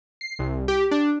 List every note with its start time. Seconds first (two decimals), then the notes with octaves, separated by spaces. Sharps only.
0.21 C7
0.39 C2
0.68 G4
0.91 D4